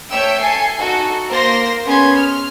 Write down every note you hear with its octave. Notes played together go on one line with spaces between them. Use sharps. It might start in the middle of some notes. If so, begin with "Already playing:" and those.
A3 C#5 E5 G5 E6
A4 G#5 C7
D#4 F#4 A4
A#3 A#4 C5 C6 A#6
B3 C#4 G#4 G#5 C6 G#6
F6